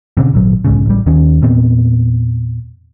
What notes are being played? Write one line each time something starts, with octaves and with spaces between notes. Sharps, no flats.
B2 D3 C4 C#4
G#1 A#2 F#3
B1 G#2 C#3
A1 G3
D#2 D#3 C#4
E2 A#2 B3 C4